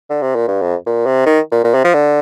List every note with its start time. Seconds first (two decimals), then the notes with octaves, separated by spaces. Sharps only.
0.10 D3
0.22 C3
0.35 A#2
0.48 G2
0.61 F2
0.86 A#2
1.06 C3
1.26 D#3
1.52 A#2
1.64 A#2
1.74 C3
1.84 F3
1.94 D3